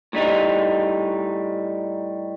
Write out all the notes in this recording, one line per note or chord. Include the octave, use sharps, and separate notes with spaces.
A2 G3 D#4